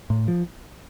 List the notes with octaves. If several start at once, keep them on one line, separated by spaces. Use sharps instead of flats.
A2
F3